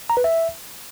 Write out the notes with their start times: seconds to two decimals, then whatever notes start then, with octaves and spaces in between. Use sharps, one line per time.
0.10 A#5
0.17 B4
0.24 E5